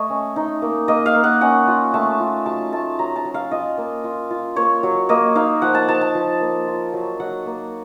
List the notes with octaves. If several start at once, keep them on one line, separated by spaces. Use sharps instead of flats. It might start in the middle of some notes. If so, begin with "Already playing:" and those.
Already playing: A3 C#5 D#5
C#4
D#4
A#3
A#3 D#5
F5
A#3
F#5
C#4 F#5
F4
A3 A5
F4
F#3 A5
A3 A5
F#3 A#5
A5
F#3
F5
F4 D#5
A#3
F4
F4
A#3 C#5
F#3
A#3 D#5
D#4 F5
F3 F#5
A5
F3 A5
A5
F3
A#3
F4
F#3
F#3 F#5
A#3